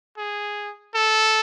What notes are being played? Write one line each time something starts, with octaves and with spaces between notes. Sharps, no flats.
G#4
A4